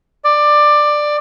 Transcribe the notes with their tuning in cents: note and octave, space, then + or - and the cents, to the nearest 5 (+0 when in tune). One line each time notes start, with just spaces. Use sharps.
D5 +15